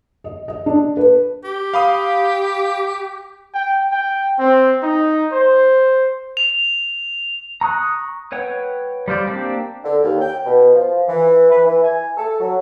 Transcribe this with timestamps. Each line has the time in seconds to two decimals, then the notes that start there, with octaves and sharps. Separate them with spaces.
0.24 D#5
0.48 D#5
0.66 D4
0.97 B4
1.44 G4
1.74 F5 B5 D#6
3.54 G5
3.92 G5
4.39 C4
4.83 D#4
5.33 C5
6.37 F7
7.61 A#5 C#6 D#6 F#6
8.32 B4 C#5 F#5 G5
9.08 G3 F4 C5 D5
9.27 A#3 C4 D4 G4
9.84 D3
10.03 D#2
10.21 G5
10.46 B2
10.74 F3
11.08 E3
11.50 B4
11.64 E3
11.84 G#5
12.17 A4
12.39 F#3